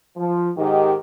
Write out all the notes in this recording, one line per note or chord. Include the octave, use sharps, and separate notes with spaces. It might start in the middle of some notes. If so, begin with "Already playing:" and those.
F3
G#2 D#3 G4